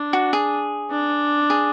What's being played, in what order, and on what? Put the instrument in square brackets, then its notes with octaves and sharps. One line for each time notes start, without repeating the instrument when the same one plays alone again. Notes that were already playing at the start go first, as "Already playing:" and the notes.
Already playing: [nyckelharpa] D4
[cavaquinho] F#4
G#4
[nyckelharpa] D4
[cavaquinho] G#4